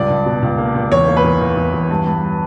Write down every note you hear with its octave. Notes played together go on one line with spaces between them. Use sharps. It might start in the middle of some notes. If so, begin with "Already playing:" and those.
Already playing: C#2 G2 D5
C#2
B2
C#2
A#3
C#2
E2 C#5
A#3
B4
E2
E2
E2
E2
G2
G2